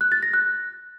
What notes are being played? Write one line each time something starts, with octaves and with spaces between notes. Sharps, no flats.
F#6
A6
A#6
F#6